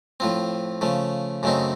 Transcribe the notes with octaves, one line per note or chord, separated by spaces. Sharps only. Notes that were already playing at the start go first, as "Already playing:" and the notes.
A2 F3 C4
C#3 F3 A3
F#2 C#3 A3 C4 D#4